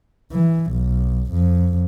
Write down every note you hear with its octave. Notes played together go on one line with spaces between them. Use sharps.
E3
B1
F2